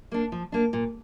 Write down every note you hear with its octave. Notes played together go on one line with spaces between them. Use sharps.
A#3 D4
F3
A#3 D4
A#2